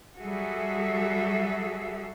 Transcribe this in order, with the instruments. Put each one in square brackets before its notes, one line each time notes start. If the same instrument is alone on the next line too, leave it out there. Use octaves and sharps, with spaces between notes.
[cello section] F#3 G3 F#4 G#4 A4 E5